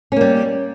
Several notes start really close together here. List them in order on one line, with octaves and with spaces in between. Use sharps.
C#4 A#3 G3